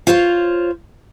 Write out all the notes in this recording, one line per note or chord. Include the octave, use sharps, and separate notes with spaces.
F4 C5 C#5 E5 F5